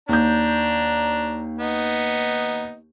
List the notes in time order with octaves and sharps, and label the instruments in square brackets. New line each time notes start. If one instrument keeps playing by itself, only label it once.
[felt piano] D#2 G6 [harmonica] D4 A#5
[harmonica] B3 D#4